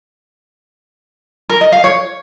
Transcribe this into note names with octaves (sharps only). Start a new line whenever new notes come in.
A#4
D#5
F5
C#5